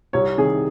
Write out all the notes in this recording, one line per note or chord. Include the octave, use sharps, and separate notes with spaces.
C2 C#5
C3 D#3 G#4